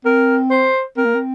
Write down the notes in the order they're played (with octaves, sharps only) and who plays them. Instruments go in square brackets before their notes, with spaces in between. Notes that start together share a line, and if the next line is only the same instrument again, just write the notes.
[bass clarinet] C4 [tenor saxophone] A#4
[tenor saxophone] C5
[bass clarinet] C4 [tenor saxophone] A#4
[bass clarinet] A#3
C4